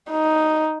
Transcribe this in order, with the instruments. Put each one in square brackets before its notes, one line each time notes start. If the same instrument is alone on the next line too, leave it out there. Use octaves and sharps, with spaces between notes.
[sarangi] D#4